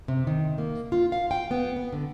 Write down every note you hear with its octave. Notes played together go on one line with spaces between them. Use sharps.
C3
D#3
A#3
F4
F5
G5
B3
B3
D3